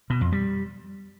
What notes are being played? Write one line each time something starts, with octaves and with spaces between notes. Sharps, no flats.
B2
F2
G3